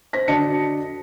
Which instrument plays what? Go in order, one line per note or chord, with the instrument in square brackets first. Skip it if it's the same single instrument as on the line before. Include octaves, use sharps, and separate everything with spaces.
[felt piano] C5 A#6 B6
D3 F#4 D5 D#5 A5 C#7